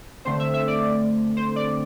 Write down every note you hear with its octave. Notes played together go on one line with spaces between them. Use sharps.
D3 A3 C4 C5
E5
E5
D5
C5
D5